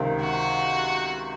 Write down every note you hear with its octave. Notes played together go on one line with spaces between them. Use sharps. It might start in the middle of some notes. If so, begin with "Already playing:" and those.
Already playing: C#2 C3 D#3
F#4